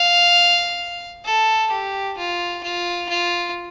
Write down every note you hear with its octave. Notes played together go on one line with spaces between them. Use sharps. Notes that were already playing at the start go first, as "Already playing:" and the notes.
Already playing: F5
A4
G4
F4
F4
F4